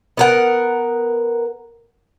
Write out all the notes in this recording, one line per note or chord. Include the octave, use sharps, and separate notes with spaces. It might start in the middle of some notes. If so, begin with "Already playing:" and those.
B3 A#4 F#5